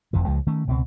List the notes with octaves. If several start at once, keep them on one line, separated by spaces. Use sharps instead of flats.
F1 F2 C3 E3
C#2 F3 G#3
D#3 A3 C#4
C#2 B2 A3 C4